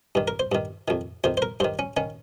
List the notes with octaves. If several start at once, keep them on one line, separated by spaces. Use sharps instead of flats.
G2 D#3
A#4
C5
G2 D#3
F2 D#3
F2 D#3 C5
C5
A#4
G2 D#3 C5
C#4
D#3 C#4